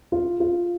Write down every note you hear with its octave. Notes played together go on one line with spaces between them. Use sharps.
F4
F4